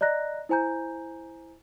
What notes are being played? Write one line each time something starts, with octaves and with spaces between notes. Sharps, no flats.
D5 D#5 A#5 F#6 A#6
E4 C5 G#5 A#5 G6